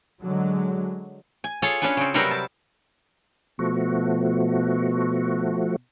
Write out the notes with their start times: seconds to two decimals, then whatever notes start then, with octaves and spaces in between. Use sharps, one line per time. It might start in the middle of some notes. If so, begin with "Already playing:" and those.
0.22 D3 F#3 G#3
1.44 G#5
1.62 F4 G#4 A4 C#5
1.82 C#4 D4 A4 B4 G#5
1.97 C#3 C4
2.14 C3 F#3 G3 C4 A#4 B4
2.31 A5
3.59 B2 F3 A3 F#4